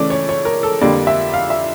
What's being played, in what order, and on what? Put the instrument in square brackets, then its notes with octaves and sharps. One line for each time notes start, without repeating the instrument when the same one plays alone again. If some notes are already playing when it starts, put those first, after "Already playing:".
Already playing: [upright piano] C#3 E3 A3 C#4 D5
C#5
C#5
A#4
A4
F2 D3 G3 A#3 D5
E5
F5
E5